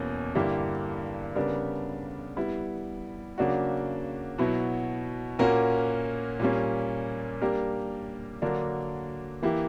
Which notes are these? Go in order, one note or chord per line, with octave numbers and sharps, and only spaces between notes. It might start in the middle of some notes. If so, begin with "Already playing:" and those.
Already playing: E2 B2 A#3 C#4
G2 D3 A#3 E4 G4
C#3 G3 B3 D4 A#4
G3 B3 E4
C#3 F#3 A#3 D4 F#4
B2 F#3 B3 E4
A#2 A#3 C#4 F#4 A#4
A#2 G3 A#3 C#4
G3 A#3 D4 G4 A#4
D3 F#3 A#3 D4 A#4
E3 A#3 E4 G4